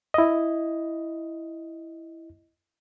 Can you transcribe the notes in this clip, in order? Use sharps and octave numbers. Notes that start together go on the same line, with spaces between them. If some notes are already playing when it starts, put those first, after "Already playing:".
E4 D#5